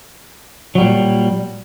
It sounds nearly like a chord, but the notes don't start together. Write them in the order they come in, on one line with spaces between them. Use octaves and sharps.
F#3 G3 A#2